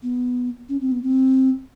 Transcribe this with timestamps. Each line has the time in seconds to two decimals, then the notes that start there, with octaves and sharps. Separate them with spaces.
0.03 B3
0.69 C#4
0.81 C4
0.92 B3
1.03 C4